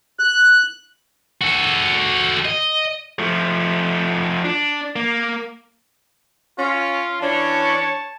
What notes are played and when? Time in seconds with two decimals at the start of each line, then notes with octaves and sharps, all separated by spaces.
0.19 F#6
1.42 F#4 A4
2.45 D#5
3.19 F3 A3
4.45 D4
4.96 A#3
6.59 C#4 F4
7.21 E3 C#4 D4 C#5 A5